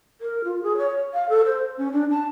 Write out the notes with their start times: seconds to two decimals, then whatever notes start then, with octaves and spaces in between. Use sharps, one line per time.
0.21 A#4
0.44 F4
0.63 G#4
0.77 C#5
1.13 F5
1.29 A4
1.45 C5
1.78 C#4
1.92 D4
2.11 A5